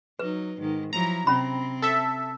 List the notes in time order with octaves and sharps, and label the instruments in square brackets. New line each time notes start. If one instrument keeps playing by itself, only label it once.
[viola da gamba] F#3 D#4 [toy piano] B4
[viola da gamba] G#2 D#3
[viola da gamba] F3 F#3 E4 [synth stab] A#5
[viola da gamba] C3 C4 [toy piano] C#4 B5
[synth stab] A4 E5